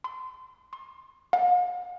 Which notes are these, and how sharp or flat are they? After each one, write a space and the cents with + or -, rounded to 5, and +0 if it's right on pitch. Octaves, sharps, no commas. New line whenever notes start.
C6 -30
C6 +30
F5 +45